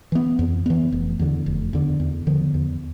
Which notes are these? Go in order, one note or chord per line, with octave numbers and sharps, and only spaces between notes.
E3 B3
F2
E3 B3
F1
E2 D3
F1
E2 D3
E2
D3 F3 B3
E2